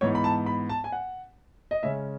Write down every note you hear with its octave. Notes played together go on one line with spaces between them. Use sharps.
G#2 E3 B3 C#5
B5
A5
B5
A5
G#5
F#5
D#5
C#3 G#3 C#4 E5